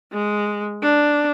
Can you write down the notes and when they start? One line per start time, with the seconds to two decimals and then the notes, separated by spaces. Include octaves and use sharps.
0.13 G#3
0.82 D4